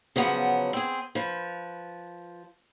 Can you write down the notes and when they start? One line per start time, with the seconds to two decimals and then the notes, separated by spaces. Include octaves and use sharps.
0.16 C#3 F3 F#3 B3
0.73 C4 G#4
1.15 F3 B4